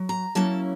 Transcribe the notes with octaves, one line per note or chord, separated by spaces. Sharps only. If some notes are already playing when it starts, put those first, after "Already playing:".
Already playing: F#3
A#5
F#3 A#3 C#4 E4 A5